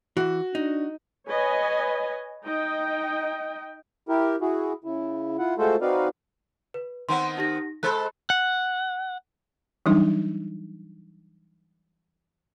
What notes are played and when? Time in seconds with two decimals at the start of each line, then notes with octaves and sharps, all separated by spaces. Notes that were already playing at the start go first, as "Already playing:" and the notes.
0.17 E3 F#4
0.55 D4 D#4
1.27 B4 C#5 D#5 G#5
2.45 D#4 D#5 G5
4.09 E4 G4 A#4
4.41 E4 F#4 G#4
4.84 C#3 E4
5.39 E4 F4 F#5
5.58 G#3 A3 F4 F#4 A4 C5
5.81 C4 D#4 F#4 B4 D5 F5
6.74 B4
7.09 D#3 B3 C4 F#5 C6
7.37 D#4 G4 A#6
7.83 G#3 A4 C5 B5 F#6
8.30 F#5
9.86 E3 F#3 G3 D4 D#4